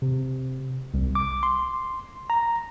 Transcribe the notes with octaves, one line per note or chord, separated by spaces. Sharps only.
C3
C2
D6
C6
A#5